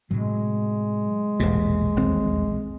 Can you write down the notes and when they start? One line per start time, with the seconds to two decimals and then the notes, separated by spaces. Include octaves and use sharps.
0.11 A2 C3 F#3 G#3
1.40 E1 A#1 E2 A2 C3 A#3
1.96 D#1 C4